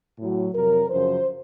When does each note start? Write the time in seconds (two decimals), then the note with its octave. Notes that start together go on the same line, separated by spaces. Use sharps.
0.18 A2 F#3
0.53 F2 C3 F#3 A#4
0.89 F#2 C#3 F3 C5